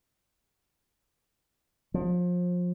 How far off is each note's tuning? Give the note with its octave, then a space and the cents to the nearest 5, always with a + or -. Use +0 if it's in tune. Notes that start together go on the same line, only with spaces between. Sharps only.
F3 +30